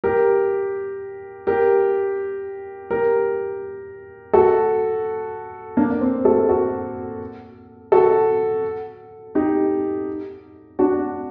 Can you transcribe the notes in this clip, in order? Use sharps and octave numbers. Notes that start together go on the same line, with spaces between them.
G4 A#4
G4 A#4
G4 A#4
F#4 A4
A#3 D4
C4
F#4 A4
F#4 A4
F#4 A4
D#4 G4
D4 F#4